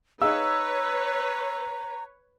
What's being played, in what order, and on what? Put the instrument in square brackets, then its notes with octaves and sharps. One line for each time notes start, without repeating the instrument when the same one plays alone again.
[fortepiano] D#4 G#4 F5 [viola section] B4 C#5 [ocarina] A#5 [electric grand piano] E6